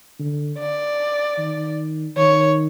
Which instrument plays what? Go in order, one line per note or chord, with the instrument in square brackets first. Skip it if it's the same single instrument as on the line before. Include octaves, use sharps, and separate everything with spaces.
[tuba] D3
[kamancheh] D5
[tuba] D#3
[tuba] D#3 [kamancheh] C#5